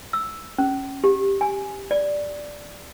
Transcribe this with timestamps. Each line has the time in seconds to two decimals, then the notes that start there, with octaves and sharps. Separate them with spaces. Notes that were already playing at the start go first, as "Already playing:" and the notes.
0.13 E6
0.58 C#4
1.04 G4
1.41 G#5
1.91 D5